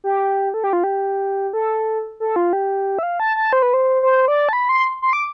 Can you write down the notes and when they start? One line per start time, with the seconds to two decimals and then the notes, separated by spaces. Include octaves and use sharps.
0.04 G4
0.54 A4
0.64 G4
0.73 F4
0.84 G4
1.53 A4
2.20 A4
2.36 F4
2.53 G4
2.99 E5
3.03 F5
3.20 A5
3.36 A5
3.53 C5
3.62 B4
3.74 C5
4.03 C5
4.28 D5
4.49 A5
4.53 B5
4.69 C6
5.02 C6
5.13 D6